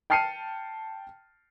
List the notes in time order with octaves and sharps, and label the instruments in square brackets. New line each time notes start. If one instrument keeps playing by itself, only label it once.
[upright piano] G5 A5 F6 C7 C#7 D#7